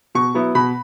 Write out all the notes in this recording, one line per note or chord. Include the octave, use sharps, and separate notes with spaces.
B2 C#6
F#3 B3 E4
B2 B5